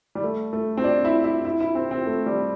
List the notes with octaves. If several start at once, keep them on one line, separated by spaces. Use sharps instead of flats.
G3
A3
A3
C4
D4
E4
E4
E4
E4
C4
C4
A3
G3